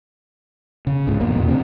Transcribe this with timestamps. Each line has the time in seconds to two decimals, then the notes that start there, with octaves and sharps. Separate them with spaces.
0.87 C#3
1.07 C#2 G#2
1.21 E1 F2 B2 A#3
1.36 E2 A#2
1.48 D2 C3 A3 C4